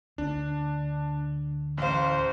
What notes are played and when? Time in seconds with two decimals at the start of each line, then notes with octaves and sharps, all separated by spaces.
0.18 D2 D3 D4
1.78 A1 C5 F5